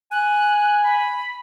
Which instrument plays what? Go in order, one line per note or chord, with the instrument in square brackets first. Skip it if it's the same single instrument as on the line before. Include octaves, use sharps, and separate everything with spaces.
[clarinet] G#5 [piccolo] F#6
[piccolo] B5